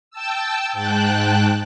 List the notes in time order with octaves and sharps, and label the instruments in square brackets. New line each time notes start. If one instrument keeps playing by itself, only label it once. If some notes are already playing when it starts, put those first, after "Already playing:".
[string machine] G5 A5 E6
G#2 G5 A5 F#6